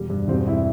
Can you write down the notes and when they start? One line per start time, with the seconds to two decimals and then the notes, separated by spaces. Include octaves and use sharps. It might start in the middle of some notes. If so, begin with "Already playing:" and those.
Already playing: E1 G3
0.10 G2
0.28 E1 C4
0.48 E4